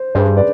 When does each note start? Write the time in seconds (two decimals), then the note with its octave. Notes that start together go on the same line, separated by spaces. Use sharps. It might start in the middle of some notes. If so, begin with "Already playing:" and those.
Already playing: C5
0.15 G2 G#4 C5
0.37 B4 D5